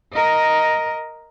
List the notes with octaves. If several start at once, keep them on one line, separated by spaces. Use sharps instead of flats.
A#4 D#5